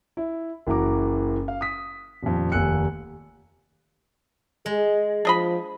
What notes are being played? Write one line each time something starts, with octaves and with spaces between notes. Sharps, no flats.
E4
F#1 E3 F#4 A#5 D6
F5
D#6 B6
D#1 F2
F1 D#2 G#5 E6 F#6 C#7
G#3 G#4
F3 D4 D#5 B5